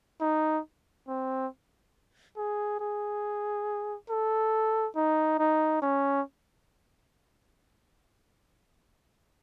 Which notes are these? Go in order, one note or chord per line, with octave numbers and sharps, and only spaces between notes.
D#4
C4
G#4
G#4
A4
D#4
D#4
C#4